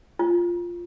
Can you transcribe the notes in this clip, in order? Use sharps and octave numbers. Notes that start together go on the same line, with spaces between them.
F4